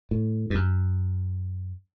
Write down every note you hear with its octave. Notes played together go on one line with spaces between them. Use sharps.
A2
G2
F#2